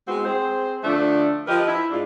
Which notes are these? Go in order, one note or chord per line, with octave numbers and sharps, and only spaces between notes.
G#3 B3 C4 E4 F#4
C4 G#4 C5
D3 F3 A3 D4
F3 G4 A#4 B4 D#5
E4
G#2 G#3 D4 F4